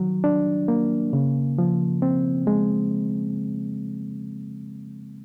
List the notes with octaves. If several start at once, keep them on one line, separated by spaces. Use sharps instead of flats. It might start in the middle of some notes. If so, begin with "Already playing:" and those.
Already playing: D#3 F#3
D4
A#3
C#3
F3
C4
G#3